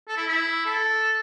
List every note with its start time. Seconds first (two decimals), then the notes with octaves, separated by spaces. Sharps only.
0.08 A4
0.17 E4
0.27 E4
0.66 A4